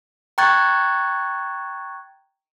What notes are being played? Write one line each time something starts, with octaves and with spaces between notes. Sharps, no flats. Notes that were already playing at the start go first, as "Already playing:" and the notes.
G5 A#5 C#6 F#6 G#6 A6